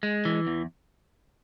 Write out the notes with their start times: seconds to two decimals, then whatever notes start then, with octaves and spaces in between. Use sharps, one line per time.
0.03 G#3
0.25 E3
0.47 E2